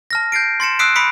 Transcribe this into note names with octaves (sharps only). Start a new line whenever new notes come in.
A5 F6 A#6
G6 A6 C7 D7
C6 A6 C#7 E7
D#6 E6 F#6 B6 C7 D7
B5 D#6 B6 C#7 D7